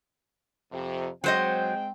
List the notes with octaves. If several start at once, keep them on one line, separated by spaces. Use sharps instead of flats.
F2 C3
F#3 G#3 C4 C5 D#5 G5